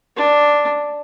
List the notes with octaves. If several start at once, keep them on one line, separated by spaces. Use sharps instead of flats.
D4